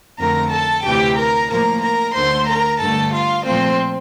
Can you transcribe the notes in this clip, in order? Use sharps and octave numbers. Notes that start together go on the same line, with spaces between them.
F2 D3 A3 A#4 A#5
A4 A5
D2 C3 E3 G4 G5
A#4 A#5
A2 F3 A#3 A#4 A#5
A#4 A#5
D2 D3 A3 C5 C6
A#4 A#5
G2 D3 A3 A4 A5
F4 F5
A#2 F3 A3 C4 C5